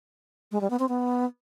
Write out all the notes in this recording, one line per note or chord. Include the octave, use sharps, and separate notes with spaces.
G#3
G3
B3
C4
B3